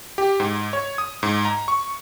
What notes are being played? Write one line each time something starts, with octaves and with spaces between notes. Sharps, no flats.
G4
G#2
C#5
D#6
G#2
A#5
C#6